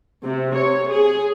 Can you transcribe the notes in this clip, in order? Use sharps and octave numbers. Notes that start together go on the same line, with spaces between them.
C3
C#5
G#4